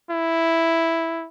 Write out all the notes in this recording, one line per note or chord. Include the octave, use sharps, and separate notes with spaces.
E4